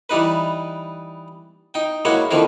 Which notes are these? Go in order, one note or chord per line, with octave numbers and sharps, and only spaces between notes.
E3 G3 D#4 B4
D#4 G5
G#3 A#3 E4 F#4 C#5
D3 D#3 F3 C4 E4